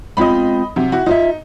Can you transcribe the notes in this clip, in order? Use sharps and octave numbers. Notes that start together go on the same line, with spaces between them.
G#3 C4 F4 D#5 B5
C3 F#3
E4 F#4
D#4 F4 C#5 E5